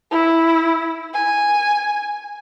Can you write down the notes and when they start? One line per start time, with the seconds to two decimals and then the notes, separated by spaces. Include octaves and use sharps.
0.11 E4
1.13 G#5